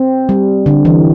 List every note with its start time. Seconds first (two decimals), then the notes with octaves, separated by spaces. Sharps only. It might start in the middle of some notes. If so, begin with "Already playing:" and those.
Already playing: C4
0.29 G3
0.66 D3
0.85 E3